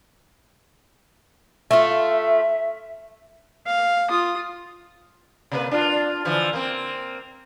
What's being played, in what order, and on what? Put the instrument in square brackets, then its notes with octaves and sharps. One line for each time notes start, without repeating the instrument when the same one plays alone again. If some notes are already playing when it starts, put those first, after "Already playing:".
[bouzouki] A3 F4 [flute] E5
[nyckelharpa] F5
F4 D#6
[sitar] C3 A#3 B4
D4 F4
D3 E3 F3
A#3 C4